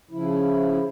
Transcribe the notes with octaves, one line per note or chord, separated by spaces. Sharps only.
C#3 F3 E4